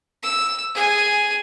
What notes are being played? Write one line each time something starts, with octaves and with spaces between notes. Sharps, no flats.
E6
G#4 G#5